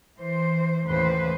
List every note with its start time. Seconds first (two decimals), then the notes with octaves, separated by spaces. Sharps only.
0.18 E3 C5
0.85 D#2 A2 C#3 E3 B4 C5